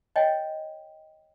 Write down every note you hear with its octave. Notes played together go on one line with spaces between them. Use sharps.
C#5 D#5 G5 G#5